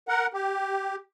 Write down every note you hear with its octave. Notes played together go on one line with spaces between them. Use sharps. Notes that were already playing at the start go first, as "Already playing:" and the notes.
A#4 F#5
G4